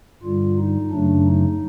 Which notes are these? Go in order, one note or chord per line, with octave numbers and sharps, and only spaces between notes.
G2 D3 G3 F4
D#4
F#2 C#3 F#3 A3 D4
D#4